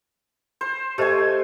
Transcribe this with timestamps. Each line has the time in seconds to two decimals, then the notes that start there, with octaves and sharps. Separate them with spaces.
0.61 C5
0.98 A3 G4 C5 D#5 G#5